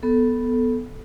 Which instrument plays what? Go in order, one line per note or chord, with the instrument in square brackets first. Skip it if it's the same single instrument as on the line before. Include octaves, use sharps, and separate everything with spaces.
[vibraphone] B3 A4